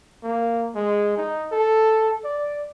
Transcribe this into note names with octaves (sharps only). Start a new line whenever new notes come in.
A#3
G#3
D#4
A4
D5